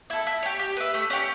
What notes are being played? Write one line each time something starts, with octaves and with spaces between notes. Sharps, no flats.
E4 A4
E4
G4 C#5
G4
B4 E5
A3
C#4 G4